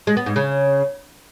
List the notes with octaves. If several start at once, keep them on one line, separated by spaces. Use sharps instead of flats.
G#3
B3
G#2
C#3